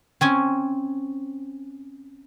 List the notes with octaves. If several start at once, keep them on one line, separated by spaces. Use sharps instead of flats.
C4 C#4 G#5